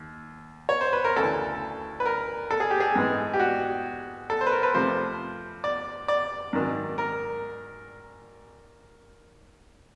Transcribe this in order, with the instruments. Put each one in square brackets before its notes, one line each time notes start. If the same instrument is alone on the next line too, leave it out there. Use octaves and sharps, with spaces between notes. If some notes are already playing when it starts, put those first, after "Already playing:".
Already playing: [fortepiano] D#2
C#5
C5
B4
A#4
D2 C#3 E3 A4
B4
A#4
A4
G#4
G4
G#4
G#2 E3 G#3 B3
G4
F#4
A4
C5
B4
A#4
B4
F2 C3 F3 A3 C5
D5
D5
G#2 D#3 F#3
A#4